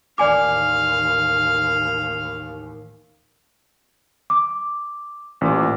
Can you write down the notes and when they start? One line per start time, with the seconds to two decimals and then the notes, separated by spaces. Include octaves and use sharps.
0.18 A1 D#2 D5 F5 G#5 D6
4.30 D6
5.41 A1 A#2 D6